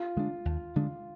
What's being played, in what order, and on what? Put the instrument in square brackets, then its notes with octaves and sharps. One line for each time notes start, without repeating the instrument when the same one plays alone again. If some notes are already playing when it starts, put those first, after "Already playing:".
Already playing: [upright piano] F4
[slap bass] D3 G#3 D4
D#2
D3 G#3 D4